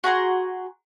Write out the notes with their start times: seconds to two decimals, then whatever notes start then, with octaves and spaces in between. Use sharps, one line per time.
0.04 F#4 G#4 A#5 C6